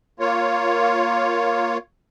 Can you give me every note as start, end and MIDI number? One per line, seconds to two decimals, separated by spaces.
0.20 1.78 58
0.20 1.78 65
0.20 1.78 73